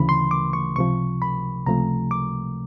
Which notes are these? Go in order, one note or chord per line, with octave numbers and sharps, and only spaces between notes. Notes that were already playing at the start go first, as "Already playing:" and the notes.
Already playing: D2 C#3 E3 B5
C6
D6
C#6
C#2 C3 F3 C#6
B5
C#2 C3 F3 A3 A#5
D6